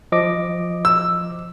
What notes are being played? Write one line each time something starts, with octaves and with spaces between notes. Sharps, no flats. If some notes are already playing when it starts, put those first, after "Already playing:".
F3 D#5 D6
E6